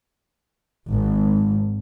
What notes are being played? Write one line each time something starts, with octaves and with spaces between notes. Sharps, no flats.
G#1